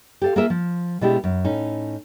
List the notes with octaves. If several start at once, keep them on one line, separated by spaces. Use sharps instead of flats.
G4 A4 F5
A#3 F4 G#4 A#4 E5
F3
B2 G#3 D4 E4 G4
F#2
A2 C#4 D#4